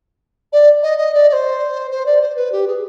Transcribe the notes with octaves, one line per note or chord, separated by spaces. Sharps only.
D5
D#5
D#5
D5
D5
C5
C5
D5
C5
B4
G4
G#4